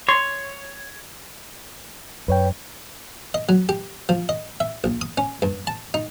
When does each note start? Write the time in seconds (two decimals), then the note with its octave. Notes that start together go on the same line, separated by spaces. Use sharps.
0.09 C#5 C6
2.28 F#2 B4 C#5 G5
3.34 D#5
3.49 F#3
3.69 G4
4.09 F3
4.29 D#5
4.60 E5
4.84 A#1
5.01 D#6
5.18 C#4
5.42 G2
5.67 A5
5.94 D#4